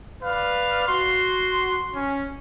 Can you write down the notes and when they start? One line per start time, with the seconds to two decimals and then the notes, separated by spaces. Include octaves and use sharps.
0.22 B4 D5 F5
0.88 F#4 C6
1.94 C#4